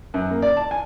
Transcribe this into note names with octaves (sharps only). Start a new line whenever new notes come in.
F#2
A#3
D5
A5
G#5